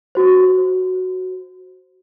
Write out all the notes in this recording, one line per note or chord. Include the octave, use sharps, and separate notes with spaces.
F#4 C5